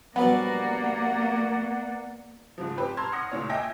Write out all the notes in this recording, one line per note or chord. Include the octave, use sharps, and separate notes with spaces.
A#1 F#3 G3 A#3 B3 D5 F#5
G#2 C#3 F3
C4 G4 B4
A5 A#5 C6 E6 F6 G#6
F#5 C6 D#6 A#6 C#7
C#2 A#2 C#5
D#5 E5 G5 G#5 G#6 A#6